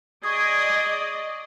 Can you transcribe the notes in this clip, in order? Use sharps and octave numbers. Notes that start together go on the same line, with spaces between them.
G#4 D5 D#5 C#6 D#6 G#6